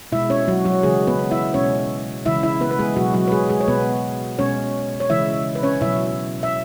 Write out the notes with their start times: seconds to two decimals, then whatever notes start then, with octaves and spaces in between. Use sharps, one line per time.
0.12 B2 G#3 E4 E5
0.30 C#4 C#5
0.48 F#3 F#4
0.65 F#3 F#4
0.83 C#3 E3 G#3 G#4
1.07 B3 B4
1.31 E4 E5
1.54 B2 G#3 C#4 C#5
2.25 C#3 E3 G#3 E4 E5
2.43 E4 E5
2.61 B3 B4
2.71 B4
2.79 G#3 G#4
2.97 B2 F#3 G#3 F#4
3.14 F#3 F#4
3.28 B4
3.32 G#3 G#4
3.50 G#3 G#4
3.60 C#5
3.67 B2 G#3 B3 B4
4.39 B2 G#3 C#4 C#5
5.00 C#5
5.10 C#3 E3 G#3 E4 E5
5.55 B4
5.63 C#4 C#5
5.81 B2 F#3 E4 E5
6.43 E5